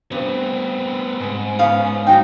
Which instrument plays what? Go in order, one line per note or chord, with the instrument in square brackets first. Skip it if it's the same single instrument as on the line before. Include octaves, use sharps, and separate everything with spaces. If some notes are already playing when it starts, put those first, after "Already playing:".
[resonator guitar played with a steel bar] G2 [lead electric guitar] B3 C4
[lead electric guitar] G#2
[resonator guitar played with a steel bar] B3 C#4 F5
[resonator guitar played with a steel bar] F#3 D#4 [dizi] G5